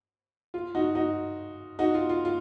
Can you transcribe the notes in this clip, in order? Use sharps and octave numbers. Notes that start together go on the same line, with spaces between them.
F4
D#4 F#4
D#4 F#4
D#4 F#4
F4
F4
F4